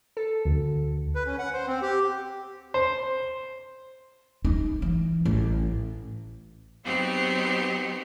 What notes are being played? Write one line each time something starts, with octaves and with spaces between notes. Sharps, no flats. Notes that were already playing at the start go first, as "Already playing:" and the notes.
A4
D2
B4
C#4
F#5
C5
C4
G4
C5
D#4
E3
A1
F#3 B3 C4 D#4 F#4 G4